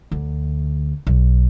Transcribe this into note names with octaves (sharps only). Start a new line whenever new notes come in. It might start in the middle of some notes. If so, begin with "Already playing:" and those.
D2
B1